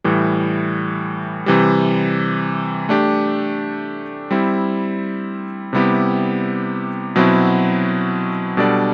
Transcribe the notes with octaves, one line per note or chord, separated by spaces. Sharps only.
A2 E3 G3
C3 E3 G3
A3 D4 G4
G3 C4 E4
C3 G3 B3 E4 G4
B2 F#3 C4 E4
B2 G3 D4 A4 D5